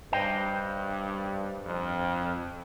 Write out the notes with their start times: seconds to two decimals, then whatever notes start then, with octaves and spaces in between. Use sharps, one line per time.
0.12 G2 C5 D#5 G5
1.65 F2